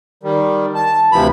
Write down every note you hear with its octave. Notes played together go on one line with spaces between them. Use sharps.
D#3 G3
A5
D2 C3 E3 F3 B5